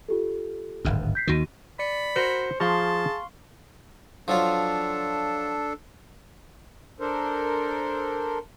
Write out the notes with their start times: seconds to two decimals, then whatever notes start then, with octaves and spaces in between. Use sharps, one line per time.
0.08 F4 G4 A4
0.85 D1 G#1 G2
1.15 G6 B6 C7
1.27 D#2 D#3 F#4 A#6 D#7
1.79 D5 B5 C#7
2.16 F#4 A#4 C5 C#7
2.60 F3 G#4 F5 A5 A#5 C6 C#6
4.28 F3 F#3 D4 F4 A4
7.00 D4 A4 A#4 C5